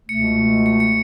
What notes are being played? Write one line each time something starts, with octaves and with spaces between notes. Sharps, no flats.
C#2 B2 A3 C#7
C#7
C#7